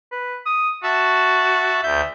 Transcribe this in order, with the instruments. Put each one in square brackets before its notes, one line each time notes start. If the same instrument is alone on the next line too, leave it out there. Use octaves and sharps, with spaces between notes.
[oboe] B4
D#6
[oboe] F#4 [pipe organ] E5 A5
[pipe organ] D2 G6 [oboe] E5